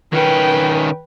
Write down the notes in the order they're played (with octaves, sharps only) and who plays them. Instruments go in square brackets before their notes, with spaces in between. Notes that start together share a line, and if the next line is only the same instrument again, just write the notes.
[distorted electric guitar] D#3 C#4 [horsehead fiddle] B4 G5